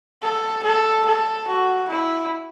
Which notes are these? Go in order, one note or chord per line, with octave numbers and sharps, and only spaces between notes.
A4
A4
A4
F#4
E4